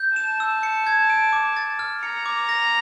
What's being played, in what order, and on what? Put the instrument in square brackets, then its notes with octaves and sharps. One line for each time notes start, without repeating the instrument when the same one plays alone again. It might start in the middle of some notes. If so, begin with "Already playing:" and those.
Already playing: [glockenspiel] G6
[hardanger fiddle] A5 [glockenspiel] E7
[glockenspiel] E6
C#7
G#6
D7
D6
A6
F6
[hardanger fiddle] A#5 [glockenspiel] C#7
[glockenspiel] D6
A#6